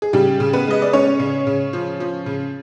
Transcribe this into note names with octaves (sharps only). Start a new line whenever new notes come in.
G#4
C#3 G3 G4
C#3
B3 B4
G#3 D#5
D5
G#3 C#4 C#5
C#3
C#3
F3
F3
C#3